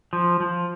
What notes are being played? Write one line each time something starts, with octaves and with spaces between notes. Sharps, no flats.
F3
F3